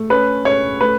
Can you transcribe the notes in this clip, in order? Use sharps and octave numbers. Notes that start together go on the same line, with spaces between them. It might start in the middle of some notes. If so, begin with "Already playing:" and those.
Already playing: A3
C#4 B4
C#4 C#5
A3 B4